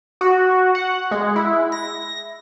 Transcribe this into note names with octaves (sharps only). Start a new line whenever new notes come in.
F#4
F#5
G#3
E4
A#6